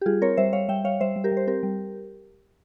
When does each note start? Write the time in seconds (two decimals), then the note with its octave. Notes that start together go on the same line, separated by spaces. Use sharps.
0.01 G4
0.06 G3 F4 G#4
0.22 C4 A#4 C#5
0.37 G3 C5 E5
0.53 G3 C#5 F5
0.69 G3 E5 G5
0.84 G3 C#5 F5
1.00 G3 C5 E5
1.16 G3
1.24 G4 A#4
1.32 G3
1.37 C5
1.47 C4 G4 A#4
1.63 G3